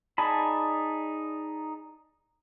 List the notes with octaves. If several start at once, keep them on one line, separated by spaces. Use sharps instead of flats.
D#4 G#4 D5 A5 B5